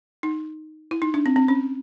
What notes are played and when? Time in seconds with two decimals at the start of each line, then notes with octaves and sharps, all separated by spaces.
0.23 D#4
0.91 E4
1.02 D#4
1.14 D4
1.26 C4
1.36 C4
1.48 C#4